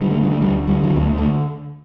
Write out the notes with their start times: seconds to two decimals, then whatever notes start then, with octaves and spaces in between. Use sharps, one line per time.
0.01 D3 G3
0.11 A3
0.21 D3 G3
0.31 A3
0.42 G3
0.45 D2
0.67 D3 G3
0.84 F#3
0.90 D2
0.96 B3
1.00 A3
1.12 D3
1.18 A3